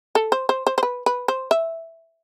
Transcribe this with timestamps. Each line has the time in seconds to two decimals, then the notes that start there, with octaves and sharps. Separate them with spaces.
0.15 A4
0.32 C5
0.49 C5
0.67 C5
0.78 C5
0.83 B4
1.06 B4
1.28 C5
1.51 E5